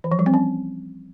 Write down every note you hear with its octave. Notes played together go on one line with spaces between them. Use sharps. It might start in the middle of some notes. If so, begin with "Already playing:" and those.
E3
F3
G3
C4
C#4